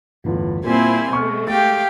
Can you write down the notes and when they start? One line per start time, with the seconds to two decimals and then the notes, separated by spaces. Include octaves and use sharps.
0.24 G1 E2 A2 F4
0.64 A#2 G3 A#3 C4 E4 G#5 C6
1.13 B2 G#3 A3 C#6 F6
1.47 G4 F5 G5 A6